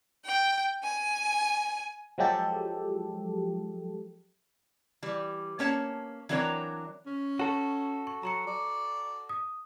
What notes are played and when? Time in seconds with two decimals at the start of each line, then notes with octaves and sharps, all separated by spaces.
0.25 G5
0.83 G#5
2.18 F3 F#3 G#3 G4 A4
5.02 E3 G3
5.59 A#3 C#4 C#5 A5
6.29 E3 F#3 C4 D4 A#4 C#5
7.06 C#4
7.39 F#4 A4 C#5 C#6
8.07 C#6
8.23 F#3 A#5 C#6 C#7
8.47 D5
9.29 D#6